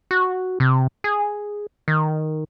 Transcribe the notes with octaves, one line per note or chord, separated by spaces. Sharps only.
F#4
C3
G#4
D#3